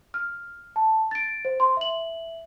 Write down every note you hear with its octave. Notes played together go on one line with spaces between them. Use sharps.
F6
A5
A6 D7
C5
C6
E5 F#7